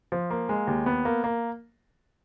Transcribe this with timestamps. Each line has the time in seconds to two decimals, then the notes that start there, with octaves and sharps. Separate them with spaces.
0.12 F3
0.30 A#3
0.49 G#3
0.67 D#2
0.86 B3
1.05 A#3
1.24 A#3